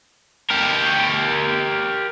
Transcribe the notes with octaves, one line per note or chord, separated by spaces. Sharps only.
G4 A#4